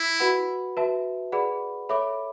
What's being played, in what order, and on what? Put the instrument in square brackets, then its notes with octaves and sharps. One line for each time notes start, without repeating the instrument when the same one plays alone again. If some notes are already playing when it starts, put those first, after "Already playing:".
Already playing: [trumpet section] E4
[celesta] F#4 B4 F#5 B5
F#4 B4 E5 A5
G#4 B4 D5 F#5 B5
A4 C#5 E5 B5 D6